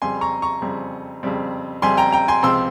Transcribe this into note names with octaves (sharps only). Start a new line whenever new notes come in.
F2 C#3 G3 C4 G#5 C6
A#5 C#6
A#5 C#6
F2 C#3 G3 C4
F2 C#3 G3 C4
F2 C#3 G3 C4 G#5 C6
G5 A#5
G5 A#5
G#5 C6
C#2 C3 F3 C4 C6 E6